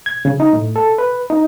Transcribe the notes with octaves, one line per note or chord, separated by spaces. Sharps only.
G#6
C#3
D#4
A2
A4
B4
D#4